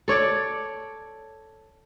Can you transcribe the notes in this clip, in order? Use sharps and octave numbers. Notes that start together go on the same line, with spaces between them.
A4 C#5 D5